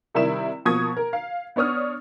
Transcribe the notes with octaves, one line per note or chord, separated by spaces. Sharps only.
C3 D#3 G3 E4 E7
B2 F3 A#3 C#6 D#6 G#6
A#4
F5
B3 D4 C#5 D#6 F6